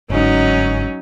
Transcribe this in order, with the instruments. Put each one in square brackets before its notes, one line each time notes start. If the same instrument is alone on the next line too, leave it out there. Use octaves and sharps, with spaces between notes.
[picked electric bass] G1 G#2 [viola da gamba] F#3 C#4 D#4